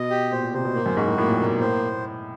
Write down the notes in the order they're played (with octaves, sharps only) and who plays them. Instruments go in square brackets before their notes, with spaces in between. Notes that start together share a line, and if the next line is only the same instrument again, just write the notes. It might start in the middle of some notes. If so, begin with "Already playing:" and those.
Already playing: [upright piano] B2 [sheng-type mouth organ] D#5
[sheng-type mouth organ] G4
[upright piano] A#2 [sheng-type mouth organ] C5
[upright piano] A#2
[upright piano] C3 [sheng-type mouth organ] C5
[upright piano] B2
[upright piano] A2 [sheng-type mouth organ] A#3
[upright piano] F#2
[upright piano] G#2 [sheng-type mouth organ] F#4
[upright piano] A2
[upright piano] A2 [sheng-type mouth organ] A#3
[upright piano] A#2
[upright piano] B2 [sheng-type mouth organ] A#3
[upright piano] A2 [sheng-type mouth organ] C5